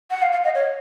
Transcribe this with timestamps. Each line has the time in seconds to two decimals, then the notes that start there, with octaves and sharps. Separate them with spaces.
0.11 F#5
0.22 F5
0.32 F5
0.44 D#5
0.55 C#5